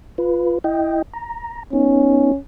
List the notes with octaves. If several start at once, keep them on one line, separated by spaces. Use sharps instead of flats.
F4 B4
E4 D#5 G5
A#5
B3 C#4 D#4